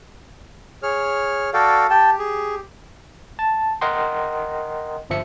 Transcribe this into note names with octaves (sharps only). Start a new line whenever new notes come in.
G#4 C#5 F6
F#4 A4 D5 F5 G5
G4 G5 A5
G#4
A5
A#4 D#5 F#5 G5 C6
G1 F3 E5 C#7